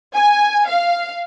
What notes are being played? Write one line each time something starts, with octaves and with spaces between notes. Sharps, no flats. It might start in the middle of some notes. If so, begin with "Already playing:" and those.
G#5
F5